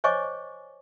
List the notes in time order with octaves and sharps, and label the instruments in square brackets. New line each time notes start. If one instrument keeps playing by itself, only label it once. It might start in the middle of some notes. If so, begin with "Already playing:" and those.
[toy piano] C5 C#5 D#5 G#5 C#6 D6